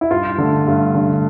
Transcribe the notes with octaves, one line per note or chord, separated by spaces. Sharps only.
E4
G2 F4
D3 A3
G2
D3 A3